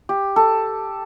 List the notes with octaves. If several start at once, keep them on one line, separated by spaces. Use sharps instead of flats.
G4
A4